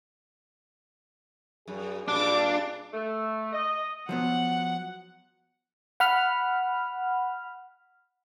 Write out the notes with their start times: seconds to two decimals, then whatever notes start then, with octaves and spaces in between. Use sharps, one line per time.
1.68 F#2 G#4
2.08 G2 A#2 G3 D4 D6
2.93 A3
3.53 D#5
4.09 F3 F#3 B3 F#5
6.00 F#5 B5 F6